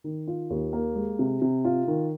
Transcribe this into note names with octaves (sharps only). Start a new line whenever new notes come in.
D#3
F4
D#2
A#3
G#3
C3
C3
F4
D#3